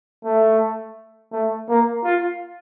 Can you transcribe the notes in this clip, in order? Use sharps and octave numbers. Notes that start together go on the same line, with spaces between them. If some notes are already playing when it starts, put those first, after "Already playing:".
A3
A3
A#3
F4